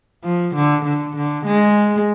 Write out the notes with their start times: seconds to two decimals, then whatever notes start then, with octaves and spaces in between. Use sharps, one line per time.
0.24 F3
0.55 D3
0.85 D3
1.16 D3
1.46 G#3